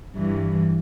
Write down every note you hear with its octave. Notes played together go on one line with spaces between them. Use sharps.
G2 E3